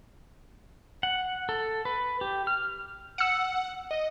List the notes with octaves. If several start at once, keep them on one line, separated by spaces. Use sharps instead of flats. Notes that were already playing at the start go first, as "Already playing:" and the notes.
F#5
A4
B4
G4
F6
F#5 E6 C#7
D#5